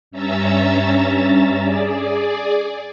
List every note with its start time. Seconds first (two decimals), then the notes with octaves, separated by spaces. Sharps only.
0.11 G2 C#4 E5 A#5 E6 A6
1.61 G#4 D5